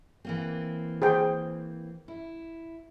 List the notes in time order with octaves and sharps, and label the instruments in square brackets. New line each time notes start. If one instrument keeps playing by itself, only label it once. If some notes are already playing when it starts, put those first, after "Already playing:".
[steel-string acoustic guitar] E3 A#3 C4
[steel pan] G#4 C5 G5
[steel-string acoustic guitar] E4